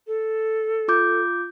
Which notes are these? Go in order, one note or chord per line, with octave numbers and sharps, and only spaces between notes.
A4
F4 D6 G6